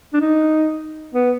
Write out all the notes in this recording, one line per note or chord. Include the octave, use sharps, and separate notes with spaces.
D4
D#4
B3